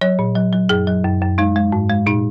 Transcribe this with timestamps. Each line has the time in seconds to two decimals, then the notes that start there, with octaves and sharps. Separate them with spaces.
0.01 F#3 C#5
0.19 A#2
0.36 F#3
0.53 F#3
0.69 F#2 G#4
0.87 F#3
1.04 F#2
1.21 F#2
1.38 G#3 D#4
1.56 G#3
1.72 G#2
1.89 G#3
2.06 A#2 D#4